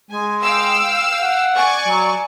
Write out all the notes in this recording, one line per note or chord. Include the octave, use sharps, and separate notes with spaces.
G#3 G#5
F5 G5 E6
F#5
D5 G#5 C#6
F#3